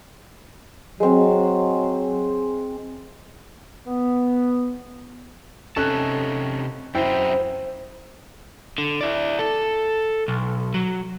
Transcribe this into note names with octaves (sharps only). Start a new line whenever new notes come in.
F#3 G#3 C4
B3
C3 C#4 D#4 A4 A5 F#6
F#2 C4 D#4 E4 C5 G5
D3
E4 D5
A4
B1
F#3